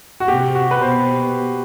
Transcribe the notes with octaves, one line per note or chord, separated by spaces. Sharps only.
F#4
C3 G4
F#4
B4
B2 C5